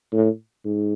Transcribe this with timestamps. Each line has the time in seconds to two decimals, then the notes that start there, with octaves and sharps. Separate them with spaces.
0.13 A2
0.65 G#2